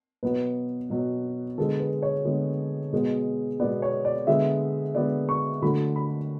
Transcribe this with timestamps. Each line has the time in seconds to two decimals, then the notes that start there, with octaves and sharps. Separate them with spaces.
0.23 B2 F#3 B3 B4
0.90 B2 F#3 B3
1.58 D3 G#3 B3 A4
1.80 B4
2.02 C#5
2.25 D3 G#3 B3
2.92 B2 G#3 B3
3.60 B3 D5
3.62 B2 G#3
3.82 C#5
4.05 D5
4.27 D3 G#3 B3 E5
4.95 D3 G#3 B3 D5
5.29 C#6
5.62 D3 F#3 A3 B5
5.96 B5